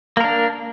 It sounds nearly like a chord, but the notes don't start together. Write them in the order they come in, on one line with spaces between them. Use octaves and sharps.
A#3 A#4 D4